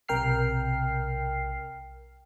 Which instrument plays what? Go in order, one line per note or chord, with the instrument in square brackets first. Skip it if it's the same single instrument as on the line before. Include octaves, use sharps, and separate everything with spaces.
[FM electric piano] B1 C3 A#4 G5 F6 C7